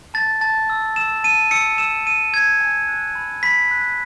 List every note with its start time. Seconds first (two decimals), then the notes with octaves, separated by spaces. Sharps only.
0.14 A5 A6
0.41 A5 A6
0.70 E6
0.96 E6 E7
1.24 A5 D#7
1.51 E6 C#7
1.78 E6 E7
2.06 E6 D#7
2.34 E6 G#6
2.60 G#5
2.88 F#6
3.15 B5
3.43 B5 B6
3.71 F#6